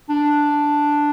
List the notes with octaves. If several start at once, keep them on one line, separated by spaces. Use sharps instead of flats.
D4